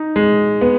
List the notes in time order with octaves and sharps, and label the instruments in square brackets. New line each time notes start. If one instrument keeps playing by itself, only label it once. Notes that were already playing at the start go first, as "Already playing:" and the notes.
Already playing: [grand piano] D#4
G#3
B3